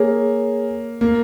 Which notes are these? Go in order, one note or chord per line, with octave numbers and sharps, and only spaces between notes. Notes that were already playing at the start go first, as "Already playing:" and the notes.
Already playing: A#3 G#4 C#5 G#5
A#3